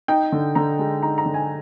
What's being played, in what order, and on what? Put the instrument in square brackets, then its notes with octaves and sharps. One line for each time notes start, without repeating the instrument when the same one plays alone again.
[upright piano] D#4 G5
D3
D3 A#5
G#3
D#4 A#5
A#5
D3
G#5